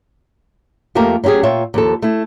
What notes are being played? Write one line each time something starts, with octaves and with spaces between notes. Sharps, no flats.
F2 A3 A#3 G4 A#4
F#3 C#4 D#4 G4 G#4
A#2 F4 C#5 E5 G5
D#2 F3 A4
A3 E4